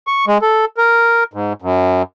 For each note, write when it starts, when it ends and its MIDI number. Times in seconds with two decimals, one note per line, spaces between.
0.07 0.25 85
0.27 0.38 56
0.42 0.65 69
0.77 1.24 70
1.34 1.53 44
1.62 2.02 42